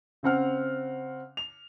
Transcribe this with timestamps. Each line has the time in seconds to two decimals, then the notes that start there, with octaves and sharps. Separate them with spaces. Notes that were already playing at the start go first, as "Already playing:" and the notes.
0.23 C#3 C4 F#5 F6
1.37 F7